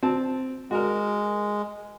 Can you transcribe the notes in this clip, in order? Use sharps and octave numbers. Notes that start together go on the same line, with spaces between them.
C4 A5
G#3 F#4 A#4